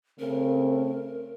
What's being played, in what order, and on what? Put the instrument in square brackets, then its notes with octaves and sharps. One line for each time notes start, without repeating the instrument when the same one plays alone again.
[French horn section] C#3 A3 C4 [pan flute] A#4